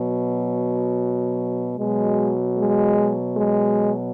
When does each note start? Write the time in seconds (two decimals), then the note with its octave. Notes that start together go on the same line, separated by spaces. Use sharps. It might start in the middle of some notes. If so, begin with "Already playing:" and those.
Already playing: B2 F#3
1.77 B2 F#3 G#3
2.57 G#3
3.37 G#3